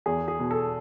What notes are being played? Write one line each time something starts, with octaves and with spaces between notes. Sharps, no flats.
E2 G#4
G#4
B2
A4